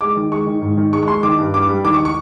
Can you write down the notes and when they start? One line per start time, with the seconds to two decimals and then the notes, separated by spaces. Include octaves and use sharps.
0.01 G#3 D6
0.17 D#3
0.31 G#3 C#6
0.47 D#3
0.62 G#2
0.77 D#3
0.93 G#3 C#6
1.03 C#6
1.08 G#3 C6
1.23 D#3 D6
1.39 G2
1.54 G2 D6
1.69 G3
1.84 D#3 D6
1.94 C#6
2.05 C#6